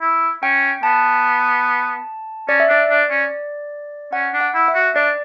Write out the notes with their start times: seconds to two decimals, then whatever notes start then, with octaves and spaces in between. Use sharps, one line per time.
0.01 E4
0.43 C#4 G5
0.83 B3 A5
2.49 C#4 D5
2.60 E5
2.68 D4 D5
2.90 D4
3.10 C#4
4.13 C#4 F#5
4.34 D4
4.41 F#5
4.55 E4
4.68 E5
4.74 F#4
4.95 D4 D5